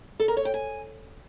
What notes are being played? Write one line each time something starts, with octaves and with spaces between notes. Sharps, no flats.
A4
A#4
C#5
G5
G#5